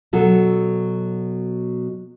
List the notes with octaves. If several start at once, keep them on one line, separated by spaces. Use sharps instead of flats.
B2 F#3 A4